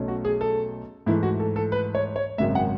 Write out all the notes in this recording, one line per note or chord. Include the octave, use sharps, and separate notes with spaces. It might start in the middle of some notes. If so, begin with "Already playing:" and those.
Already playing: B1 B2 A3 C#4
F#4
G#4
A4
G#2 E3 A3 E4
F#4
A4
A4
B4
C#5
C#5
G#1 F#2 C#3 G#3 E5
F#5